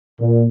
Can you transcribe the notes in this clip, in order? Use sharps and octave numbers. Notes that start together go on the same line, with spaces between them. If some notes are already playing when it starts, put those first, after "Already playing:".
A#2